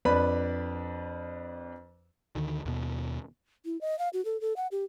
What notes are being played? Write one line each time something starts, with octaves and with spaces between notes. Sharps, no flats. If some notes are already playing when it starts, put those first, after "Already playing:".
F2 D4 B4 B5
D2 D3 D#3
D#2 B2
E4
D#5
F5
F#4
A4
A4
F#5
G4